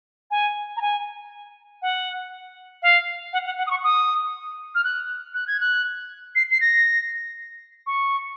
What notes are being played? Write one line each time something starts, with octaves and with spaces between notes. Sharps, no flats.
G#5
A#5
G#5
F#5
F5
F#5
F#5
F#5
D#6
C#6
D#6
F6
F#6
F#6
G#6
F#6
C7
C7
A#6
C#6